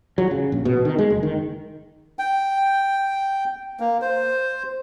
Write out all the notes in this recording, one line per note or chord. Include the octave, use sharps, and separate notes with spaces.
F#3
C#3
A#1
B2
D#3
G#3
F#1
D#3
G5
A#3
C5